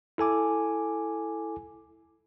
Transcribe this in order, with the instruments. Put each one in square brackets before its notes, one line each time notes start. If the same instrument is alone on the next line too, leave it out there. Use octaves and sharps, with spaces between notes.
[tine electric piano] E4 A4 G#5 D6